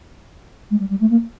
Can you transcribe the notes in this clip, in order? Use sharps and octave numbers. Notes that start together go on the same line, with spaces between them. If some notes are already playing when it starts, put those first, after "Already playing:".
G#3
G3
G3
A3
A#3